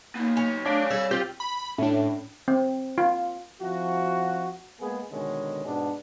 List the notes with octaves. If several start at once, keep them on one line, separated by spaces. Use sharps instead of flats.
A#3 B3 D#4
F#3 C#4
A3 D4 C#5 F5
G3 G#4 A4 E6
C4 F4 G4
B5
A2 C#4 D4
C4
F4
F3 C4 E4 F#4
G#3 A#3 B3 G#4
B2 D3 D#3 G#3 B3 C#4
G#2 B2 B3 D4